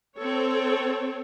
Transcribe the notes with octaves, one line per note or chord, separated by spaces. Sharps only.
C4 A4 C#5